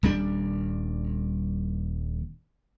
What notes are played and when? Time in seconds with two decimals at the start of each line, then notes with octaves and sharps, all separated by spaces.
0.03 D#1 G3 D4